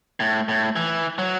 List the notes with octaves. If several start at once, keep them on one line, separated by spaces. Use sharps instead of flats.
A2
A2
E3
F#3